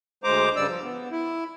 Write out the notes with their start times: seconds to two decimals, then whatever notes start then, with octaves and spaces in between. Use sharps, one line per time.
0.24 D2 G#3 C5 A#5 D6
0.56 G2 C#3 G3 D5 E6
0.68 F3
0.83 B3
1.11 E4